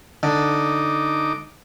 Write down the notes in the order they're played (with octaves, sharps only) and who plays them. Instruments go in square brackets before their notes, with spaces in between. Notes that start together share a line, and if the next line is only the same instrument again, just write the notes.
[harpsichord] D3 [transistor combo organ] D#4 D6